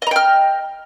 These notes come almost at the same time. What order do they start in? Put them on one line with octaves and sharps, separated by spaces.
D#5 A#5 G5 F6